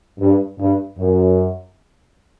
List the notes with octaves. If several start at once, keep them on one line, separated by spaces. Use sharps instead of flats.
G2
G2
F#2